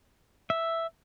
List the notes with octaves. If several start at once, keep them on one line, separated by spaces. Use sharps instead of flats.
E5